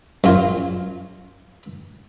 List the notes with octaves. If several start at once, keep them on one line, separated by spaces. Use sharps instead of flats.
F#2 F4